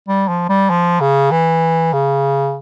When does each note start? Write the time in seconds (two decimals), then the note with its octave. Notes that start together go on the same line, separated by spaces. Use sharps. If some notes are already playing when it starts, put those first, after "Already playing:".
0.08 G3
0.28 F3
0.49 G3
0.70 F3
1.00 C#3
1.31 E3
1.93 C#3